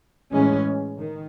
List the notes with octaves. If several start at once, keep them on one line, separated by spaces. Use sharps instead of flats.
A2 E3 G#3 C#4
D#3